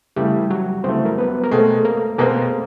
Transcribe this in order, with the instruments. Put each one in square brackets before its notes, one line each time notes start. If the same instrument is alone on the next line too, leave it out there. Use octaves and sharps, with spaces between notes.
[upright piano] C#3 E3 A3 [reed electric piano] G3 G4
[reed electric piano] F#3 F#4
[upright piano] C#3 E3 A3 [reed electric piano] C4 C5
[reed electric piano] A#4
B3 B4
A#4
[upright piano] B2 G#3 C4 [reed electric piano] A3 A4
[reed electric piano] A#3 A#4
[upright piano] B2 G#3 C4 [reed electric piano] A#3 A#4